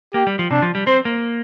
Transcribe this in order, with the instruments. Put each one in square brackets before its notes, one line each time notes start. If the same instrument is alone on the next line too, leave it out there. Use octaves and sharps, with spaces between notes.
[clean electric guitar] A#3 [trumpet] G4
[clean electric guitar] G3
F3
[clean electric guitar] C3 [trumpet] D4
[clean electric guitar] F3
G3
[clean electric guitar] C4 [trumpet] C5
[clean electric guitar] A#3